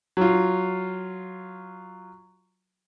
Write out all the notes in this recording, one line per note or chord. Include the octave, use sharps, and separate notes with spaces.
F#3 F4